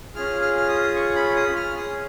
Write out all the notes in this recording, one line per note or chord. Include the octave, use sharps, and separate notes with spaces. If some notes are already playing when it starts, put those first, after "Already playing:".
C#4 F4 G#4 F6
F6
F6
D#6
C#6
B5
D#6
F6
C#4 G#4 D#6